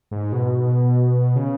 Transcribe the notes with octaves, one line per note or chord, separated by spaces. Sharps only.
G#2
B2
C#3